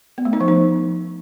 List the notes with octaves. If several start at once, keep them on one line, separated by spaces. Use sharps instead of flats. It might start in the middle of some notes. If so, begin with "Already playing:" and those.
B3
A3
D#4
F3
D#4